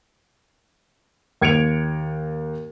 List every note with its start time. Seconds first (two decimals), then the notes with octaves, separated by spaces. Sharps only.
1.41 D#2 G#6 C#7 D7 F7